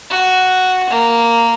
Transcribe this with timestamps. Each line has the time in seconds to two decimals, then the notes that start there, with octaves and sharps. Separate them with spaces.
0.10 F#4
0.90 A#3